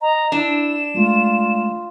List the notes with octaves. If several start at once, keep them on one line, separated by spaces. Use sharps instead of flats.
D#5 A#5
D4 E4 E7
G#3 A3 F4